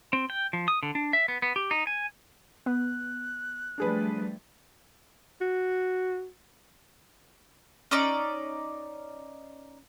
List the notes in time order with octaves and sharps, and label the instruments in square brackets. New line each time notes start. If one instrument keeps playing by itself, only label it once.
[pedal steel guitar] C4
G5
F3
D#6
D3
D4
E5
B3
B3
G4
D#4
G#5
[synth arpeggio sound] B3 [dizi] F#6
[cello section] F3 G3 A3 [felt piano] D4 G#4 B4
[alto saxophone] F#4
[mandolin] C#4 D#4 D5 D6